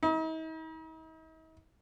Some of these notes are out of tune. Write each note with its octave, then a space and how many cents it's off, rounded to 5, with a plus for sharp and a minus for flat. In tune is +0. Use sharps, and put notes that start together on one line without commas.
D#4 +45